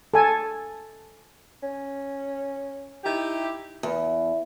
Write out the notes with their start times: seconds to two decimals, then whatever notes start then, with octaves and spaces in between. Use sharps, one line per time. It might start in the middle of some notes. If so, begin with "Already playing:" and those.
0.14 A4 G#5 A5
1.63 C#4
3.04 D#4 E4 G4
3.83 E2